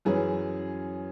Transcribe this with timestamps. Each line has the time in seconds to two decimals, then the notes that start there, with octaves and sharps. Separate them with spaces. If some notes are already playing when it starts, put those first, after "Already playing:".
0.05 F#2 E3 C#4 G#4 B4